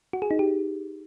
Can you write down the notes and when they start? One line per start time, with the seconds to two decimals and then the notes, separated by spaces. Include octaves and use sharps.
0.13 F#4
0.22 G#4
0.31 D#4
0.39 G4